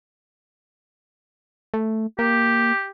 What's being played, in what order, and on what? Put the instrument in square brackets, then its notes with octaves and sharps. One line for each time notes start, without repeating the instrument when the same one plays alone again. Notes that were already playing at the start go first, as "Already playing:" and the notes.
[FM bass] A3
[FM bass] A#3 [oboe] G4